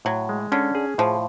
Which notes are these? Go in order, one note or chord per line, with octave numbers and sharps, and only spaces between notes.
A2 F#3
G#3
D3 C#4
G#4
A2 F3